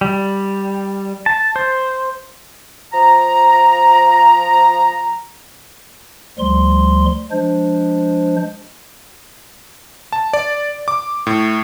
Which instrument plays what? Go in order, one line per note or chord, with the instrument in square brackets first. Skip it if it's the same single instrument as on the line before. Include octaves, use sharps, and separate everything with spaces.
[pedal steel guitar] G3
A5
C5
[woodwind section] F3 A#5
[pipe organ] D2 F3 G3 C6
F3 G#3 D4 C5
[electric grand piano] A5
D5
D6
A2